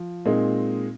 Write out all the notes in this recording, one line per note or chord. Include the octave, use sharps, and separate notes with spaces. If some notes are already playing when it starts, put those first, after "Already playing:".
Already playing: F3
A#2 G#3 C4 D#4